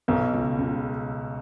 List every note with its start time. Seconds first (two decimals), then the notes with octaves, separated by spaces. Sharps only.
0.08 B1 B2
0.33 C#2 C#3
0.58 C#2 C#3